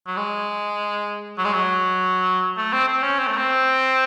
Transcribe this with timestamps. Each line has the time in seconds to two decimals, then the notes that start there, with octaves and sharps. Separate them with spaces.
0.07 F#3
0.17 G#3
1.38 F#3
1.45 G#3
1.53 F#3
2.57 A3
2.73 C4
2.88 C4
3.02 C#4
3.18 C4
3.27 A3
3.37 C4